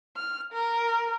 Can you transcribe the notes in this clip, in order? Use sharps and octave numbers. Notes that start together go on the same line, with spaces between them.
F6
A#4